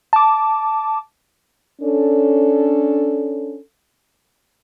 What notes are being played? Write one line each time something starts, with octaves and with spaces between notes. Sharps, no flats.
A5 D6
C#4 D4 A4